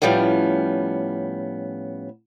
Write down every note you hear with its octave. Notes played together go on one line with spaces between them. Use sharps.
A2 F3 G3 B3 C#4